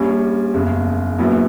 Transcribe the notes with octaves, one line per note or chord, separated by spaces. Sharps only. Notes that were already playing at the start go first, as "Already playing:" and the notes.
Already playing: A#1 A#2 G3 C#4
F#1 E2 C#3
A#1 A#2 F#3 B3 E4